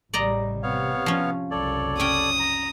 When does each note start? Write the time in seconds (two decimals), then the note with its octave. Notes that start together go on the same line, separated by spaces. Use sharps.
0.14 A1 C#3 G3 D5 D#5 A#5
0.63 C3 B3 C#5 F5
1.06 F3 C#4
1.51 F#1 C2 A4 C#5 D5
2.00 C#4 G5 D#6
2.39 A#5